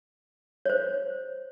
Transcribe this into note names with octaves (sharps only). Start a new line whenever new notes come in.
C5 C#5